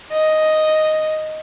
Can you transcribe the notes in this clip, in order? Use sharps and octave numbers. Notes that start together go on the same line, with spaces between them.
D#5